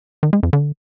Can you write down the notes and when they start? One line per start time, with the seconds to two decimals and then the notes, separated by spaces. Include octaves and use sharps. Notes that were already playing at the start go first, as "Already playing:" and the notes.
0.23 D#3
0.33 G#3
0.43 F2
0.53 D3